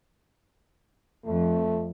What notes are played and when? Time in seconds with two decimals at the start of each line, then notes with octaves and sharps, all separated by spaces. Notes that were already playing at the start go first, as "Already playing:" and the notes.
1.26 F2 A3